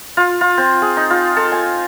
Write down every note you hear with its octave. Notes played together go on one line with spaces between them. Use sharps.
F4
F4
C4
G#4
D#4
F4
A4
G#5